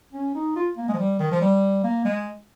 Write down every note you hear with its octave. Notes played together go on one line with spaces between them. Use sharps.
C#4
D#4
F4
A#3
G#3
F3
G3
D#3
F3
G3
A#3
G#3